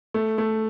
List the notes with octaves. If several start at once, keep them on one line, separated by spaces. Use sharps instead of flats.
A3
A3